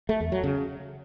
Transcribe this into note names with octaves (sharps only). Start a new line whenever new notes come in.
A3
E2
F#3
C#3